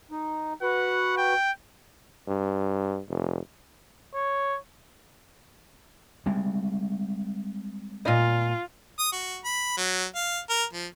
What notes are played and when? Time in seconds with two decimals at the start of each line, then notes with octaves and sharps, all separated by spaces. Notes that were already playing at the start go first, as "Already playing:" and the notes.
0.11 D#4
0.62 F#4 B4 F#5
1.17 G5
2.27 G2
3.09 F1
4.14 C#5
6.26 G3 G#3 C4
8.05 A#2 F4 D#5
8.99 D#6
9.12 F#4
9.44 B5
9.77 F#3
10.15 F5
10.50 A#4
10.73 F3